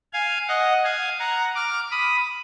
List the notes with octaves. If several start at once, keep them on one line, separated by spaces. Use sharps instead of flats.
F5 G#5
D#5 F#5
F5 G#5
F#5 A#5
D6 F6
B5 D#6